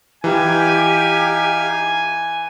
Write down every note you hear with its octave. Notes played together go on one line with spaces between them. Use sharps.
E3 D#4 G4 F5 G#5